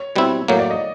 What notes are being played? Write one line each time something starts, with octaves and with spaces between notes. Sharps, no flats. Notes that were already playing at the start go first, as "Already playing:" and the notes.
Already playing: C#5
B2 G3 C4 E4
A2 F#3 A#3 C#5
D5
D#5